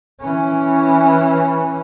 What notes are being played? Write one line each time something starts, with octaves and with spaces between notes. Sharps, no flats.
E3 C#4